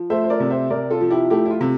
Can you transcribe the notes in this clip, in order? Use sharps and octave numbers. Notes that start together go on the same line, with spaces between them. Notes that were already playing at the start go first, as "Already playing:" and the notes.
Already playing: F3
A3 C5 E5
C5
A#4 D5
C3
C5 E5
C3 A#4 D5
F4 A4
F3
E4 G4
A3 E4 G4
E4
F4
C3